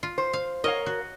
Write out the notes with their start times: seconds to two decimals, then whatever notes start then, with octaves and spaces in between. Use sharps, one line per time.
0.03 F4
0.18 C5
0.33 F5
0.64 A#4 C#5 D#5 F5
0.86 F#4